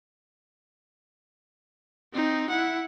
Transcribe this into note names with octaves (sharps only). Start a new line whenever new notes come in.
C4 D#4
E4 F#5